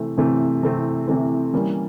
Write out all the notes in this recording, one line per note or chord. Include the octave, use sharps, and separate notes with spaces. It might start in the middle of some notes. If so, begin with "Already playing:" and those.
Already playing: C3 E3 A3 C4
C3 E3 A3 C4
C3 E3 A3 C4
C3 E3 A3 C4
E3 G3 A#3 C#4